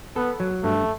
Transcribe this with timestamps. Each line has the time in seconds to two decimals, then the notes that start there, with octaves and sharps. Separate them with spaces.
0.16 B3 A4
0.40 F#3
0.64 G2 A3